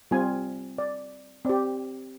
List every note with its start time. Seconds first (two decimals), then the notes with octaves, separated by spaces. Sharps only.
0.11 G3 C4 F4 G#5
0.78 D5
1.45 C4 G4 D5